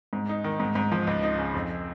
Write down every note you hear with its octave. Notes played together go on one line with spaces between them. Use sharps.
G#2
D#4
D#3
G#2
G#2
F3
C#2
D#4
C#3
F2